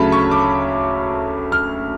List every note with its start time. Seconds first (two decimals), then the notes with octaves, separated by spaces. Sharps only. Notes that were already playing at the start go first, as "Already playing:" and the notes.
Already playing: D2 C#3 F#3 A3 C#4 A5 B5
0.12 C#6
0.31 D6
1.52 F6